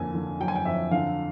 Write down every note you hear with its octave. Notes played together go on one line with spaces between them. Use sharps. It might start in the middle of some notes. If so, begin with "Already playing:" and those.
Already playing: F2 D3 A#3 G#5
D3
F#3 G5
G#5
G5
F2 E5
D3 F5